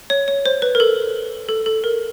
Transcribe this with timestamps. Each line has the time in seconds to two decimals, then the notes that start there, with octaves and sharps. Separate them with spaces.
0.10 C#5
0.28 C#5
0.46 C5
0.62 B4
0.75 A#4
0.80 A4
1.49 A4
1.66 A4
1.84 A#4